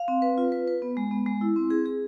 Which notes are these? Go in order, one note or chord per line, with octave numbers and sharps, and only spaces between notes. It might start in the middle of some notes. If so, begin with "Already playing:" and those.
Already playing: F5
C4
B4
F4
B4
B4
B3
G#3
B3
G#3
E4
C4
G#4
G#4